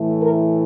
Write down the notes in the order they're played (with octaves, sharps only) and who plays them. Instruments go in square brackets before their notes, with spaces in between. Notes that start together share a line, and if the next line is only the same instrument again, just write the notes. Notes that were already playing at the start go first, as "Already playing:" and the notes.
Already playing: [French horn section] A2 E3 A3
A#4